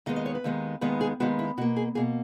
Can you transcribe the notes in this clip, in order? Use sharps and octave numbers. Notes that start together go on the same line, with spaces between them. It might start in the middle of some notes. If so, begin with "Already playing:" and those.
D#2 D#3 G#3 B3 D#5
D#5
C#5
B4
D#2 D#3 G#3 B3
D#2 D#3 G#3 B3 B4
G#4
D#2 D#3 G#3 B3 F#4
E4
B2 A#3 F#4
G#4
B2 A#3 G#4